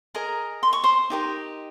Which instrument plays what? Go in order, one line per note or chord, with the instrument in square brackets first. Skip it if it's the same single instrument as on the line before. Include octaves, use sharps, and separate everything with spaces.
[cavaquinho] G#4 A#4 D#5 A#5
C6
C#6
C5 C6
D#4 G4 A#4 D#5